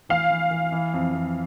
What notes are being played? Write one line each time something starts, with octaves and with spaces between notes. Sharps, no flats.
E3 F5
E3
E3
E3
F2
F2